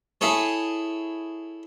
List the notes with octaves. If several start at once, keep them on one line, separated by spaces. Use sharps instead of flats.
E4 G#4 A4 C#5